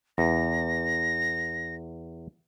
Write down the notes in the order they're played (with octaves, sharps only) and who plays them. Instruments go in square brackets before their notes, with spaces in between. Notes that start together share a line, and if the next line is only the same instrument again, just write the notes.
[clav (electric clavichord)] E2 [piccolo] A#6